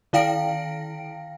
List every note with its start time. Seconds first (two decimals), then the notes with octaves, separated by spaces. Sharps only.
0.13 D#3 E4 F5 G5 A#6 D7